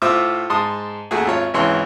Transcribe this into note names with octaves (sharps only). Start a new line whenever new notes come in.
A2 F4 C5 E5 D6
G#2 A5 C6 D#6
D#2 A3 F#4 G#4
G#1 F4 C#5
G#1 C#2 E3 C#5 C6